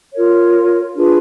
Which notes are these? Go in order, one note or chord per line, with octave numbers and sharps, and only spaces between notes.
F4 A#4 C#5
D4 F4 G#4 B4